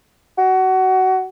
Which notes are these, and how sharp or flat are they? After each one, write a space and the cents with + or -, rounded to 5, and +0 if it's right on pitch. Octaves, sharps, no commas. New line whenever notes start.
F#4 +20